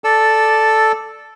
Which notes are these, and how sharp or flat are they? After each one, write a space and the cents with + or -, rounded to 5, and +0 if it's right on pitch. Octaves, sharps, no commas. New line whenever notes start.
A4 +0 D5 +0 E6 +0